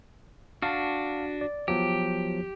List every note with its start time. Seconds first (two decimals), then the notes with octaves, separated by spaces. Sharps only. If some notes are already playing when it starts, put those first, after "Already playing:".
0.62 D4 F#4 F5 A5
1.41 D5
1.68 F3 F#3 B3 G4